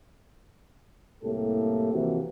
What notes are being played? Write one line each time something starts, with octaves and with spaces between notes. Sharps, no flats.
C2 A2 A#3 G4 A4
F2 C3 E3 A#3 F#4 G4